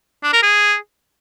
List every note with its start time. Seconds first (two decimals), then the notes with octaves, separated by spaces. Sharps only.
0.23 D4
0.33 A#4
0.43 G#4